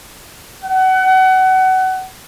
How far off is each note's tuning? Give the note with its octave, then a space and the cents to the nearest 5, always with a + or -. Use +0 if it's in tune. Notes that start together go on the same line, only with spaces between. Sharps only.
F#5 +25